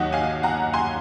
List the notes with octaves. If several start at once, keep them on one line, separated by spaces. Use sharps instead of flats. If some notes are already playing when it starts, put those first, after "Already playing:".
Already playing: D#2 D#3 F#3 D#5 F#5
F5 G#5
F#5 A#5
G#5 C6